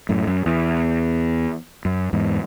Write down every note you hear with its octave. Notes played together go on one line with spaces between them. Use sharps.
F#2 A2
F#2
E2
F#2
E2 G#2